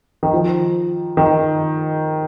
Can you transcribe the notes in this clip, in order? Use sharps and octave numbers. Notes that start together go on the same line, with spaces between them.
D#3
F3
D#3